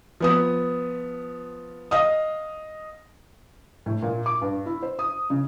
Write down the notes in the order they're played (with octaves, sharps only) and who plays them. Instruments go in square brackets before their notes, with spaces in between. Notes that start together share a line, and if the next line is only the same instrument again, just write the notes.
[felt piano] F3 B3 D#6
D#5 F5 D#6
A2
A#2
D6
G2
E4
C5
D#6
C#3